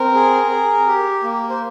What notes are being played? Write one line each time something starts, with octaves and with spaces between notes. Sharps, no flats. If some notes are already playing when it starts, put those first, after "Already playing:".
Already playing: C4 A#4
G#4
G#4
G4
A#3
C5